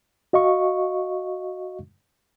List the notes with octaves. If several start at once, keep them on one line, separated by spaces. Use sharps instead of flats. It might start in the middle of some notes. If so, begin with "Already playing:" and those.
F#4 D#5 F5 C#6